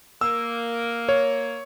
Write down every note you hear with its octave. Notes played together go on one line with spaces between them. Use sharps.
A#3 E6
C#5